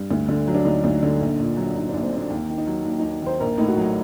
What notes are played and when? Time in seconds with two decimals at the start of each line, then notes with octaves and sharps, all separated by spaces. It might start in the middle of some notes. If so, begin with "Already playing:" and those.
Already playing: G2
0.11 D2
0.28 D3
0.48 F#3
0.54 D4
0.65 D2 D#4
0.84 D2
1.03 D3
1.21 A#1
1.39 A#2
1.57 F#3
1.76 A#1 D#4
1.89 A#1 D4
2.03 C4
2.12 A#2 D4
2.30 D#2
2.49 D#3
2.58 D#4
2.67 F#3
2.85 D#2
2.99 D#2 D#4
3.22 D#3 C5
3.40 A#1 A#4
3.58 A2 D#4
3.68 F#4
3.77 F#3 D#4